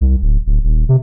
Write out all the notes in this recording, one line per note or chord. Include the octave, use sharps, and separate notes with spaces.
C2
D1
D1
D#1
C3